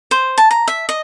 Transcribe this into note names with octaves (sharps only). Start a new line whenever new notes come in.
C5
A5
A#5
E5
D#5